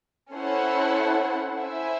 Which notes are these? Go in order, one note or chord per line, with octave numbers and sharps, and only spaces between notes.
C#4 E4 A4 C5 F#5
E4 C5 E5 G#5